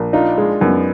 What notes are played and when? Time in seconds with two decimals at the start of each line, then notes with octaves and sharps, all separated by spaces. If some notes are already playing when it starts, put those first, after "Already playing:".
Already playing: A#1
0.13 D4 D#4 F4
0.38 G#3
0.61 F#2 B3 D#4